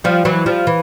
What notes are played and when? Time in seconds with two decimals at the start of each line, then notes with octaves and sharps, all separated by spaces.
0.04 F3 G3
0.25 E3 F#3
0.46 F3 G3
0.67 E3